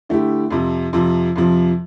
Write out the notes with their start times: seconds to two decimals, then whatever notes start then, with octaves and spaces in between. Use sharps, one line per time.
0.09 D3 A3 E4 G4
0.51 F2 C3 F3
0.93 F2 C3 F3
1.36 F2 C3 F3